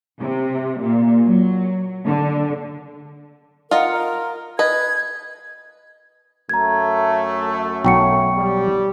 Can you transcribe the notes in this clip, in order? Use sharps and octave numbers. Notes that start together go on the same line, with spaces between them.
C3
A#2
F#3
D3
F4 A#4 D#5 F#5
A#4
B4 D#5 G#6
F#2 A3 A#5 G#6
B1 F#3 G5 C#6 C#7
G3